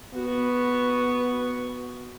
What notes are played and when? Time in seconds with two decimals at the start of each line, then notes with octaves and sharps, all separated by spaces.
0.14 B3 F#4 C#6